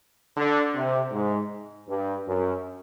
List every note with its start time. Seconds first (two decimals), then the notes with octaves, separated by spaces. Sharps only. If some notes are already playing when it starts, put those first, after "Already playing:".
0.36 D3
0.74 C3
1.12 G#2
1.88 G2
2.26 F#2